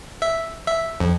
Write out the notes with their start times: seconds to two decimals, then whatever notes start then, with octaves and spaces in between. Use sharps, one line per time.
0.22 E5
0.67 E5
1.00 F2